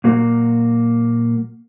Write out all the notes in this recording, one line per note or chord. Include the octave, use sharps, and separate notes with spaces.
A#2 F#3 A#3 F#4